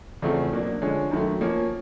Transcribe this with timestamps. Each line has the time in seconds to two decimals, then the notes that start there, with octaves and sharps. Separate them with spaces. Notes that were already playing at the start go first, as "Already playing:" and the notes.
0.22 E2 C#3 F3 A3 C4
0.52 B2 F#3 A#3 D4
0.82 D3 F3 G#3 C#4
1.11 F#2 D#3 F#3 A3
1.41 F3 A#3 C#4